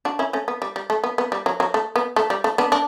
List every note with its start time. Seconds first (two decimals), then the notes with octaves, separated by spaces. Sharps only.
0.05 D4 F#4
0.19 C#4 E4
0.33 A3 C#4
0.48 B3
0.62 G3
0.76 G3
0.90 A3
1.04 B3
1.18 B3
1.32 G3
1.46 F#3
1.60 F#3
1.74 A3
1.96 B3
2.16 A3
2.30 G3
2.44 A3
2.58 B3 D4
2.72 D4